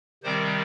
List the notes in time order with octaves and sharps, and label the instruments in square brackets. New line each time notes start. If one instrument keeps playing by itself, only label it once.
[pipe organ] C3 D#3 G3 C4 C5